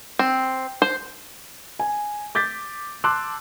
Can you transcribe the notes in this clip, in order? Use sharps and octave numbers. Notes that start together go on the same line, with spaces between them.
C4
C5
G#5
D6 G6 A6 B6
A5 C6 D6 E6 F#6